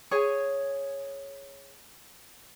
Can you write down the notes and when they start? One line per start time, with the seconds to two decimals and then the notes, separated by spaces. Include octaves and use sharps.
0.11 G#4 C#5 G#5